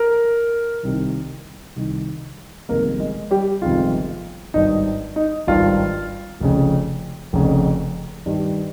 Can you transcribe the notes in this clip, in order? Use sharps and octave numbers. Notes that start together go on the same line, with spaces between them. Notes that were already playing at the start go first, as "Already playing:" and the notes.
Already playing: A#4
C2 C3 D#3
C2 C3 D#3
G1 F2 C3 D#3 G#3 A#3 A#4
G#3 G#4
G3 G4
G1 F2 C3 D#3 G#3 F4
G#1 G2 D#3 D#4
D#4
G#1 G2 D#3 F4
F1 F2 C#3
F1 F2 C#3
G2 D#3 G3